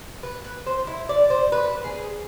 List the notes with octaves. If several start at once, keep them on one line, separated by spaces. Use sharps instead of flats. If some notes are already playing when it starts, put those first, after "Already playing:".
B4
B4
C5
E4
D5
C5
B4
G#4